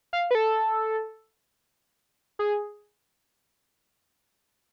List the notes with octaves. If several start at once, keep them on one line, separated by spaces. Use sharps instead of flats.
F5
B4
A4
G#4